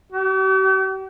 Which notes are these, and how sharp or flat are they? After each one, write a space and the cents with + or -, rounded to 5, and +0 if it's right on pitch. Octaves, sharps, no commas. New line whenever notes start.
G4 -45